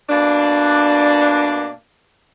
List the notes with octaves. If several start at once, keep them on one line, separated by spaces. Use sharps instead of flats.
B2 A#3 D4